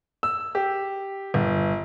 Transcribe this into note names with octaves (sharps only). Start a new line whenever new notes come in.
E6
G4
G1